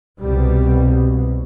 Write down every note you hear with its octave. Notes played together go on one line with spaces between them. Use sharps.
C2 B2 G3